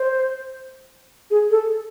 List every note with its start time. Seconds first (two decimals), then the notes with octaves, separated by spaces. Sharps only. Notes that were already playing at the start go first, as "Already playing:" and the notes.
Already playing: C5
1.31 G#4
1.51 A4